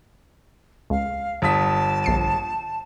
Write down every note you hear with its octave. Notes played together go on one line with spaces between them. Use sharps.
C#2 F5
G1 A5 D#6 B6
A#1 C7 D7